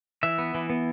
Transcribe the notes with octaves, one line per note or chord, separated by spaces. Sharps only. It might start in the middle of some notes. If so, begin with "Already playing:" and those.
E3 E5
B3
E3
B3